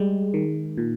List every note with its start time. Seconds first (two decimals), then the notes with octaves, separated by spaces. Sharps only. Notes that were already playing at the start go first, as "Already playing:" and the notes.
Already playing: G3 G#3
0.34 D#3
0.77 A#2